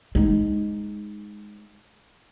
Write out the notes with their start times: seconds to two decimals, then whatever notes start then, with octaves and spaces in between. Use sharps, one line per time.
0.15 G#3 D#4